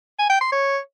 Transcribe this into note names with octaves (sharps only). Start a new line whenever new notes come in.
G#5
G5
C6
C#5